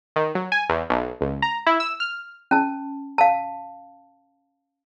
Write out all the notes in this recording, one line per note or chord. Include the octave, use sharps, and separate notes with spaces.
D#3
F#3
G#5
E2
B1
C#2
A#5
E4
E6
F6
C#4 A5
F5 A5